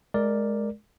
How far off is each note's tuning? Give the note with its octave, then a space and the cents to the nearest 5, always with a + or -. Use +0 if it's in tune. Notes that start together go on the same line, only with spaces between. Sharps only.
G#3 +20 A#4 +0 D5 +0